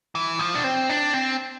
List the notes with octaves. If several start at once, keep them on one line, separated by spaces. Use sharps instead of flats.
E3
F3
D4
C4
D4
C4